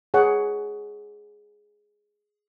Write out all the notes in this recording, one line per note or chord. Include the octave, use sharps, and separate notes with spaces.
G#4 C#5 F#5